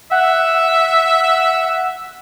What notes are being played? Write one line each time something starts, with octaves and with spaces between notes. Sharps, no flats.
E5 F#5